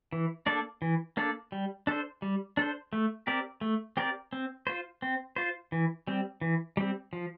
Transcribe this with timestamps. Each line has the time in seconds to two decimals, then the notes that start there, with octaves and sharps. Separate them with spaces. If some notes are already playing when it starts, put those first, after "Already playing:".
0.12 E3
0.46 A#3 D4 A4 D5
0.82 E3
1.17 A#3 D4 A4 D5
1.52 G3
1.87 D4 A4 C5
2.22 G3
2.57 D4 A4 C5
2.93 A3
3.27 C4 G4 A#4 D5
3.61 A3
3.97 C4 G4 A#4 D5
4.33 C4
4.67 F4 C5
5.02 C4
5.36 F4 C5
5.72 E3
6.07 G3 C4
6.41 E3
6.77 G3 C4
7.13 F3